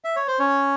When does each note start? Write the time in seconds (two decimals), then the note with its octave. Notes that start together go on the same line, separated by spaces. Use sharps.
0.04 E5
0.16 C#5
0.28 C5
0.39 C#4 C#5